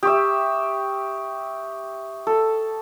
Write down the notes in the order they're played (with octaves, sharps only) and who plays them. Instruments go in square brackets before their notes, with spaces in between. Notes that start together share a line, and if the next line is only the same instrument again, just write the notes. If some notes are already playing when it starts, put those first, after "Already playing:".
[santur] G4 E5 [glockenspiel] C#6 D#6
[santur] A4